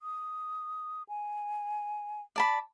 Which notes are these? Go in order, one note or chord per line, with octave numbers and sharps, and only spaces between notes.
D#6
G#5
D5 A5 B5